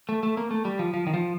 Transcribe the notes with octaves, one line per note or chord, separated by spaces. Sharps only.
A3
A3
A#3
A3
G3
F3
F3
D#3
F3